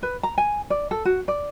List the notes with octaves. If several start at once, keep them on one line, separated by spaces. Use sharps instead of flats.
B4
A#5
G#5
D5
A4
F#4
D5